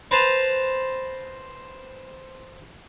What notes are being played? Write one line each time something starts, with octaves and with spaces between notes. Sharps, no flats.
B4 C5 A5 A#5